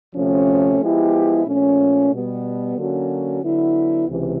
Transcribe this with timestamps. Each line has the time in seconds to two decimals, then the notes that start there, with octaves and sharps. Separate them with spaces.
0.14 D2 C3 F3 A3 C#4
0.79 F3 G#3 B3 E4 G4
1.45 A#2 F3 A3 C#4
2.10 B2 G3 B3
2.76 D3 F#3 A#3 C#4 F#4
3.41 D3 F#3 B3 E4
4.07 C#2 C3 E3